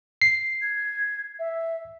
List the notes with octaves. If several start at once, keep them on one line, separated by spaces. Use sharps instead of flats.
C7
G#6
E5